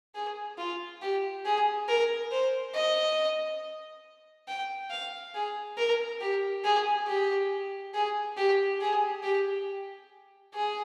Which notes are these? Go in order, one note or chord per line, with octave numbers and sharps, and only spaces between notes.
G#4
F4
G4
G#4
A#4
C5
D#5
G5
F5
G#4
A#4
G4
G#4
G4
G#4
G4
G#4
G4
G#4